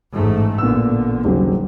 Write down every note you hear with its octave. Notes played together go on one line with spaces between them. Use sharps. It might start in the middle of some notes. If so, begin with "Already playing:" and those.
A1 G#2 A3
A1 A#2 D3 B3 E6
D#1 C#3 F#3